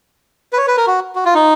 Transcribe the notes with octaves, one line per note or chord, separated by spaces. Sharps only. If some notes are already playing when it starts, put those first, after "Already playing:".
B4
C#5
B4
A#4
F#4
F#4
F4
D#4